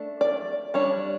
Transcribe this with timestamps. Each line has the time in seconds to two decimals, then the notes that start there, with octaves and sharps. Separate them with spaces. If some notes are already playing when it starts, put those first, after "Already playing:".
Already playing: A3 D4
0.21 D5
0.74 G3 D4 C#5